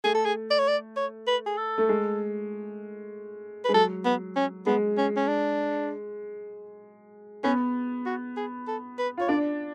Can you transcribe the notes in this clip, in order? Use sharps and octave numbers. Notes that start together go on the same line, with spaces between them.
A3 G#4
A4
G#4
D5
C#5
D5
C#5
B4
G#4
A4
A3
G#3
B4
G#3
F#3 A4
B3
C#4
G#3 B3
C#4
C#4
D4
B3 C#4
F#4
G#4
A4
B4
F4 C#5
D4 D5